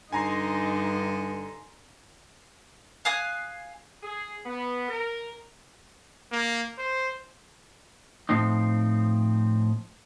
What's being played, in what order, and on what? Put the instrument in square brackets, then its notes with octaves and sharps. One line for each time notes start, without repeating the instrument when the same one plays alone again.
[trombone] G2 [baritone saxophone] D3 [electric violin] D#4 D#5 [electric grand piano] G#5 A#5 C6
[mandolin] F5 G#5 D#6 F#6
[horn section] G#4
B3
A#4
[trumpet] A#3
C5
[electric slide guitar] A2 F3 C4 D#4